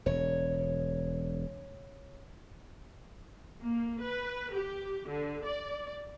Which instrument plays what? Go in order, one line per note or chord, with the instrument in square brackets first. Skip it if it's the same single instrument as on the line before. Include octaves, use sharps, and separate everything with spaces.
[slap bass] E1 [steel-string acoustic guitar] C#5
[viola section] A#3
B4
G4
D3
D5